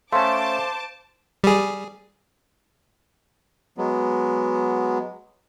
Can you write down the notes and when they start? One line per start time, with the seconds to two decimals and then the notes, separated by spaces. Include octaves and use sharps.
0.13 A3 C#4 C5 F5 A5 C6 D6
1.44 G3 G#4
3.78 F#3 G#3 B3